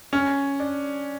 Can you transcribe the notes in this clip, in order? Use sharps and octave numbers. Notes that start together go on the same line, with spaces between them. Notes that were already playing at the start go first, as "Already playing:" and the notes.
C#4
D4